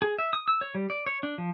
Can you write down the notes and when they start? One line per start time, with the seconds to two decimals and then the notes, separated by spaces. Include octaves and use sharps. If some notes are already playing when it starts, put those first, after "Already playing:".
0.02 G#4
0.19 E5
0.33 D#6
0.48 E6
0.61 C#5
0.75 G3
0.90 D5
1.06 C#5
1.23 D4
1.38 F3